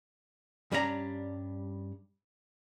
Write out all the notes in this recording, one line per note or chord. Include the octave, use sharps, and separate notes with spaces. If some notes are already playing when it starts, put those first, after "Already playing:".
G2 G3 C#4 D4 B4 A#5